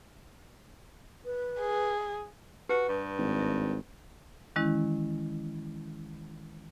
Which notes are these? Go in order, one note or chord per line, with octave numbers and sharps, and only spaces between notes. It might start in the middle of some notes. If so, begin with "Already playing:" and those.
B4
G#4
F#4 G4 B4 A5
G2
G#1
E5
D#3 E3 G#3 C#4 E4